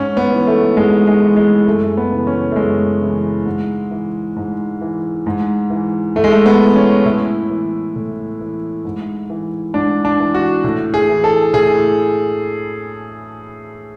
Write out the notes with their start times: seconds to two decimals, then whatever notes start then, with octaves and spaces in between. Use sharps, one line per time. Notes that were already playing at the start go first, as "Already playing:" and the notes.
Already playing: G#2 C#4
0.17 B3
0.32 E3
0.47 A3
0.77 G#2 G#3
1.07 G#3
1.22 E3
1.37 G#3
1.67 F#2 A3
1.97 B3
2.12 C#3 E3
2.27 C#4
2.52 A3
2.56 F#2 G#3
3.01 C#3 E3
3.46 G#2
3.91 E3
4.36 G#2
4.81 E3
5.26 G#2
5.70 E3
6.15 G#2 A3
6.24 G#3
6.32 A3
6.46 B3
6.60 E3
6.76 C#4
7.05 A2 E4
7.50 E3
7.96 A2
8.40 E3
8.85 G#2
9.30 E3
9.74 G#2 D4
10.05 D4
10.20 E3
10.34 F#4
10.64 A2
10.94 G#4
11.09 E3
11.24 A4
11.53 A2 G#4